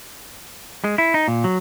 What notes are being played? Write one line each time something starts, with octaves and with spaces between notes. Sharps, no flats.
G#3
E4
D#4
A#2
F#3